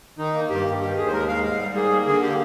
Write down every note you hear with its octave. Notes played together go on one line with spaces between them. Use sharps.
D#3 D#4
A#3
G2 G4
G2
D#3 G4
D#2 G#4
C5
G#3 A#4
G#3 F5
G#2 F5
G3
A#3 G#4
A#3
D3 G#4
G4